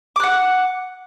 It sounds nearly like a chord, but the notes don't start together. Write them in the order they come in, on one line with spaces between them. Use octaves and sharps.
D6 F#6 F#5